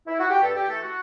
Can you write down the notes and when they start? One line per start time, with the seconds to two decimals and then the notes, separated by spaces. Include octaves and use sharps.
0.07 E4
0.19 F#4
0.30 G4
0.42 G2 A4
0.56 G4
0.69 E3 A3 A4
0.82 F#4